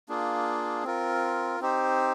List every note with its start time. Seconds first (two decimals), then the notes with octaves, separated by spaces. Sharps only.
0.09 A#3 D4 F4 G#4
0.84 C4 F4 A#4
1.60 C4 D#4 G4 C5